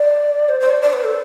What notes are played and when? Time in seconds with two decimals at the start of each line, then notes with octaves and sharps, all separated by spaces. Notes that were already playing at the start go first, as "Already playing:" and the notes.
Already playing: D5
0.49 C5
0.60 C5
0.70 D5
0.82 D5
0.93 B4
1.04 A4